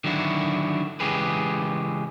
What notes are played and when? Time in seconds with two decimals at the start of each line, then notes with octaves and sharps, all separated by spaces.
0.04 D3 D#3 F#3 D4 E4 F#4
1.00 C#3 E3 G#3 G4 G#4 B4